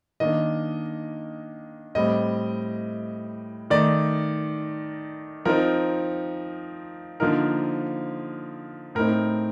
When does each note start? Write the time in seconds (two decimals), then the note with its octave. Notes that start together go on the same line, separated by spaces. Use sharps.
0.20 D#3 A#3 D4 D#5
1.95 A2 G3 C4 D#5
3.70 D#3 A3 D#4 D5
5.45 F3 C4 D#4 A#4
7.20 D3 F3 A#3 D#4 A#4
8.95 A2 A3 C4 D#4 A#4